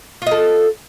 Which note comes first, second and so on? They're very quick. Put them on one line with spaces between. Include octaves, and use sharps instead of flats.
F4 D#5 A4